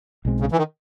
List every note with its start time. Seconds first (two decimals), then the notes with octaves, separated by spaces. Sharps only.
0.25 B1 B2 G#3 C4
0.40 C#3
0.52 E3
0.58 D#3